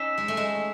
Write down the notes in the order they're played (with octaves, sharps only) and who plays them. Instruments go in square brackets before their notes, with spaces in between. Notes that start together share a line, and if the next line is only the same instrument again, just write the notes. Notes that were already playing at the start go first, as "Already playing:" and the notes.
Already playing: [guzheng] C#4 D#4 [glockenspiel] E6 B6 E7
[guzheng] G#3
A3
G#3